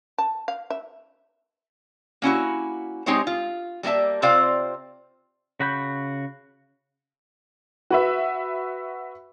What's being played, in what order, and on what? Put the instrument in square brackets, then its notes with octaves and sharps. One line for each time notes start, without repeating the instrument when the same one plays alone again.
[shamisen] A5
F5
E5
[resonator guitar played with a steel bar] A#3 C#4 E4 F#4
G#3 C4 D#4 G4 C5 C#5
F4
G3 A#3 A4 E5 A5
C3 C4 F4 C5 D5 F5
[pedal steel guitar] C#3 F#4 B5 G6
[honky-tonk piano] F#4 B4 E5